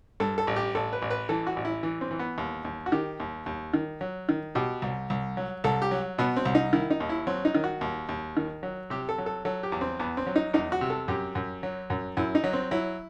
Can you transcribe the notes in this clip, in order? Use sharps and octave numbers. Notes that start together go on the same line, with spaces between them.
G2 A4
A4
A1
G4
A1 A4
B4
A1
B4
E3 A4
F#4
A1
E4
E3
C4
E3
B3
D#2
D#2
F#4
D#3 G4
D#2
D#2
D#3
F#3
D#3
B2 G4
C2
C2
F#3
C2 A4
G4
F#3
B2 B3
C4
C2
D#4
D#3 E4
D#4
D#2
E4
F#3 C4
D#4
D#3
F#4
D#2
D#2
D#3
F#3
C3 G4
A4
F#3
A4
F#3 A4
G4
E2
C4
E2 B3
C4
F#3
D#4
E2 D#4
F#4
C3
A4
F#2 G4
F#2
F#3
F#2
F#2 E4
D#4
F#3
C4
F#3 E4